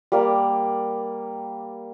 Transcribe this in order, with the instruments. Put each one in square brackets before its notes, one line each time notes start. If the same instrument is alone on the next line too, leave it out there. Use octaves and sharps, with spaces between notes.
[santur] G3 A#3 D5